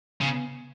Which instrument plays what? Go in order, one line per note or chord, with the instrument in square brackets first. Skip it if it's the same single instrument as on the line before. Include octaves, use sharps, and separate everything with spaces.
[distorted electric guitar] C#3 [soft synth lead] B3